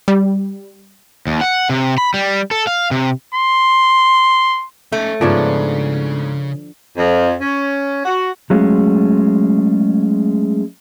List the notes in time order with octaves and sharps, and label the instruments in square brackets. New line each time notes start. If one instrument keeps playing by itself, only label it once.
[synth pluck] G3
[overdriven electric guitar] D#2
F#5
C3
B5
G3
A4
F5
C3
[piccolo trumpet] C6
[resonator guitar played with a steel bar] A3 [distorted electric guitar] C#4 D#4
[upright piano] G#2 B3 D7 [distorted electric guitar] C#3 [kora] F3 D4 C#5
[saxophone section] F2
C#4
F#4
[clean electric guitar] F#3 G#3 A3 C#4 F4